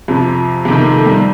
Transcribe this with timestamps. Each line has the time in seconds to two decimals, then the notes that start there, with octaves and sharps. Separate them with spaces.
0.08 F2 C3 F3
0.65 F2 C3 D#3
0.80 A#3
0.93 A3
1.06 G3